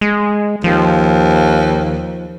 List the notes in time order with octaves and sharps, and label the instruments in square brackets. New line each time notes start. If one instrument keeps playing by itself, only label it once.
[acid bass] G#3
[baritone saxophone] D#2 [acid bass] F3